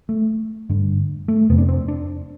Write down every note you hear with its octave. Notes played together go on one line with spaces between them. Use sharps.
A3
G2 D3
A3
F2 C3 B3
D4
C4
D4